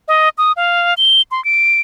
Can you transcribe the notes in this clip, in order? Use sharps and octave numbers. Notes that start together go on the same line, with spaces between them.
D#5
D#6
F5
G7
C6
D7